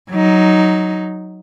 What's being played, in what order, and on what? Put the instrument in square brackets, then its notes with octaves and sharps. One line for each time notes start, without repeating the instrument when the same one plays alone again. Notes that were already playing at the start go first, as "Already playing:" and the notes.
[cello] F#3 D#4